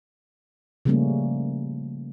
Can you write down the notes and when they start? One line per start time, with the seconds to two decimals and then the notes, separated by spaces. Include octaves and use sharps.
0.85 C#3 F3 G3 A3 A#3 C#4